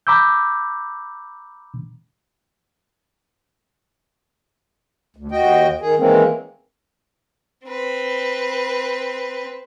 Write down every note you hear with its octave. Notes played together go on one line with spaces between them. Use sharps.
A#5 B5 D6 E6 G6
D2
D#2 F#4 D#5 G5
D#3 G#4
D#3 E3 G#3 A#3 C4 C#4
C4 B4